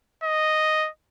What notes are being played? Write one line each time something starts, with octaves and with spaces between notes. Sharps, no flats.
D#5